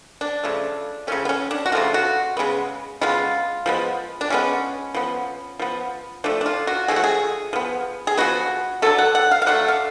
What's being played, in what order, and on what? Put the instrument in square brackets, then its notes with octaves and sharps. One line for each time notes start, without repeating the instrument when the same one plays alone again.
[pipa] D4
C#3 F3 A3
C#3 F3 A3 C#4
B3
C#4
D4
F#4
C#3 F3 A3 F4
F#4
C#3 G#3 B3
C#3 G#3 B3 F4
F3 G#3 B3
D4
F3 G#3 B3 C#4
F3 B3
F3 B3
F3 A3 D4
D4
F4
F#4
F3 A3 G#4
F#4
G#4
F3 B3
G#4
F3 B3 F#4
D3 F#3 A3 A4
F#5
F#5
F5
F5
D3 F#3 A3 F#5
F5